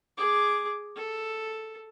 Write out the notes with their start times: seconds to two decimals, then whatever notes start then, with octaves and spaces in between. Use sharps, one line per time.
0.18 G#4 D6
0.96 A4